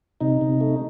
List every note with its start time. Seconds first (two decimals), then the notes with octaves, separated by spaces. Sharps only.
0.21 C3 D#4
0.41 C3
0.61 A3